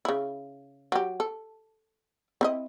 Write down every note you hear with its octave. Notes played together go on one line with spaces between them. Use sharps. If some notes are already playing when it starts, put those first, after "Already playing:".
C#3 E4
F#3 G4
A4
C4 E4 D#5